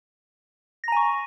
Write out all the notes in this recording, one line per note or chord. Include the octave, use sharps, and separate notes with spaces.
G#5 A#5 C#6 A#6